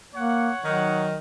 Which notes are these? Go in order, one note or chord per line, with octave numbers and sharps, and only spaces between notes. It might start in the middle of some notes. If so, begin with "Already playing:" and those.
A#3 C#5 F#5
D#3 F#3